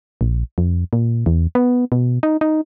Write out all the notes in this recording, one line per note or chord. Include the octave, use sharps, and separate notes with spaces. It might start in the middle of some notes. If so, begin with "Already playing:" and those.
A#1
F2
A#2
E2
B3
B2
D#4
D#4